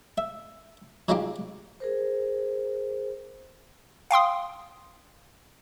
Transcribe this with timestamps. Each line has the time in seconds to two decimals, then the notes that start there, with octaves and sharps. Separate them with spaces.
0.18 E5
1.08 F#3 G#3 C#4 D#4 F4 G4
1.80 G#4 A#4 C5
4.11 F5 G5 C6 D#6